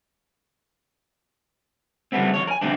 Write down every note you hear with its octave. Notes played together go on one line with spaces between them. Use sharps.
C#3 F#3 G3 A3 B3 C4
F2 C#3 C#5
A#4 G#5
F2 B2 D3 A3 C4 D4